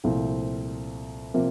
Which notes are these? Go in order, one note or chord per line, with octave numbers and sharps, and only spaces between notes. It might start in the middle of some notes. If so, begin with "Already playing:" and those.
C2 A#2 F3 A3 C4
C3 F3 A#3